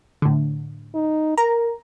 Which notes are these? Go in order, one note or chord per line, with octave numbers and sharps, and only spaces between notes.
A2 D3
D#4
A#4 A#5